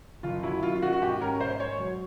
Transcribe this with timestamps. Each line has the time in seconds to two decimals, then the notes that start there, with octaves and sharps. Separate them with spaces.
0.23 F#1 F4
0.43 F#3 E4
0.62 D#3 F4
0.75 F4
0.82 D#3 F#4
0.93 F#4
1.02 G#2 G4
1.20 C#4 A#4
1.40 G#2 C5
1.60 G#3 C#5
1.79 F#3